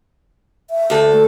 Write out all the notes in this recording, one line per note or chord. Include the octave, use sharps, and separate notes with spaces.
E5
D2 A4
A3